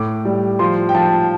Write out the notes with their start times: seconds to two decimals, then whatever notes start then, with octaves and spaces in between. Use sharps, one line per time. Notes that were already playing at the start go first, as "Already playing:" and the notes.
Already playing: A2 D6
0.25 G3
0.59 F3 C6
0.89 G5
0.95 F3 A5